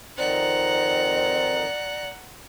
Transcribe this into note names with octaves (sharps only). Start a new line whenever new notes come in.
F2 D#3 C4 D#4 D5 F#5 A#5